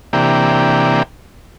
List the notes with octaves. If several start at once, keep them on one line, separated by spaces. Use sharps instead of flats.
C3 E3 A#3 D4 G4